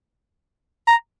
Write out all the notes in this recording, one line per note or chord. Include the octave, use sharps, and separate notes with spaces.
A#5